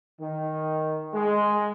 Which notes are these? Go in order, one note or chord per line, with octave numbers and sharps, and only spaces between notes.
D#3
G#3